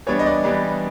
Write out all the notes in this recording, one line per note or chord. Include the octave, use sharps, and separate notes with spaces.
E3 G3 B3 D4 C#5
D#5
D5
E3 G3 B3 D4